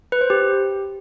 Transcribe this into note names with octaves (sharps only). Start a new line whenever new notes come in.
B4
C5
G4